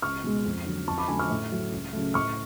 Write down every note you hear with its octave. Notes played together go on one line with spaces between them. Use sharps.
C#2 C#6 F6
B2 G#3
F2
D3 F#3
F2 A5 C#6
B5 D6
D3 F#3 A3 G#5 B5
C#6 F6
A2
F#3 A3
C#2
C#3 F#3 A3
A2 C#6 F6